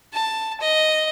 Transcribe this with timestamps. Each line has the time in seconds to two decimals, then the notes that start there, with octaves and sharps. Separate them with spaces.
0.13 A5
0.60 D#5